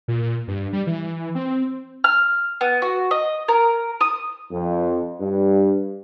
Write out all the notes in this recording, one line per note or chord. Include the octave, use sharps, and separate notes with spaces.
A#2
G2
G3
E3
C4
F6
B3
F#4
D#5
A#4
D#6
F2
G2